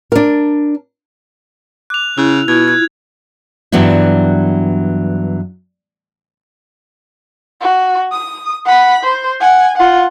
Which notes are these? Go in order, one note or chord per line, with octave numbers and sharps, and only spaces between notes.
D4 A#4
D6 F#6 F7
C#3 E4
B2 E4 F4 G#6
F#6 G#6
G2 E3 F#3 B3 D4 E4
F#4
D#6
F#5 B5
C5
F#5 G#5
F4 F#5